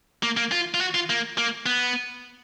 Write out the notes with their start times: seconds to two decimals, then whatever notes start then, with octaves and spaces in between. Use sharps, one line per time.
0.23 A#3
0.37 A#3
0.52 F4
0.74 F4
0.81 F#4
0.94 F4
1.10 A#3
1.38 A#3
1.66 B3